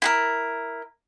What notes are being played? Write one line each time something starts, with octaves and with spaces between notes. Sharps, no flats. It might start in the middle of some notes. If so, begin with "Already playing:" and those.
E4 G#4 A#4